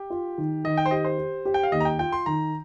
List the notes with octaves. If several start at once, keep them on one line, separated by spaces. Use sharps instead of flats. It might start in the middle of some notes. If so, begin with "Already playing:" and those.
Already playing: G4
F4
D#3
D#3 D#5
G5
C5
G4 D#5
C5
G4
G4
G5
F5
D#2 D#5
A#5
G5
F4 G5
C6
D#3 A#5